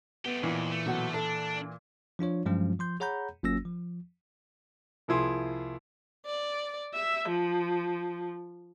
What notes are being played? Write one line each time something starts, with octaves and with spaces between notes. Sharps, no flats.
A3 B3 G4
F2 A#2 E3
A3
B2 F#3 F#5
D4 A4
F3 D4 F4 C#5
G2 F3 F#3 G#3 C#4 F4
F3 C6 G6
G#4 C#5 F#5 A#5 B5 G6
G1 F#3 A#3 C#4 E6 A#6
F3
C2 F3 A#3 E4 G#4 C6
D5
E5
F3